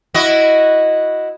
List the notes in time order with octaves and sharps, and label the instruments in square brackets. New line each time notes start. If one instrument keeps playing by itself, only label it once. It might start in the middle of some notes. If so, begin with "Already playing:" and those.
[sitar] E4 F#4 D#5